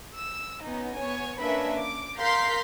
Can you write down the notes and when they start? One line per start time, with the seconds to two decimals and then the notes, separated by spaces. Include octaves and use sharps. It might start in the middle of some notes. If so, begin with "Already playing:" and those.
0.15 E6
0.62 B3 C#4 D#4
0.97 B3 C#5 G#5
1.39 A#3 C#4 D4 B4 E5 B5
1.76 D6
2.17 A#4 F5 A#5 C6 G6 B6